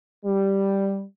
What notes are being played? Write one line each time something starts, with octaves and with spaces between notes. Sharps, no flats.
G3